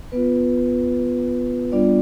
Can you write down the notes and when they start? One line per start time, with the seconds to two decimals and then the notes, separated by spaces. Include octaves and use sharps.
0.12 B3 F4 B4
1.72 G3 B3 D4 F4 D5